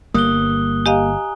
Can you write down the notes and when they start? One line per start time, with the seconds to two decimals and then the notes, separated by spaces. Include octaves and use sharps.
0.14 G1 G3 A#3 D#6 F#6 G7
0.86 G4 D#5 F5 G#5 A#5